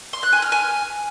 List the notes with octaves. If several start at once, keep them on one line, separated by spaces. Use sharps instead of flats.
C6
F#6
G#5
F6
G#5